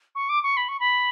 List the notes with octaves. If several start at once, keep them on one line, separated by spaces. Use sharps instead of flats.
C#6
D6
C#6
B5
C#6
B5